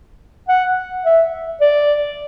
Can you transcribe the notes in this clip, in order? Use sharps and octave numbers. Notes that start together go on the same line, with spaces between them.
F#5
E5
D5